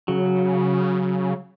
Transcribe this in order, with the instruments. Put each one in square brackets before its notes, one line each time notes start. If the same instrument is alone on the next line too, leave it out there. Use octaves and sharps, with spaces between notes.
[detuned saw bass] C#3 [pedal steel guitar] F#3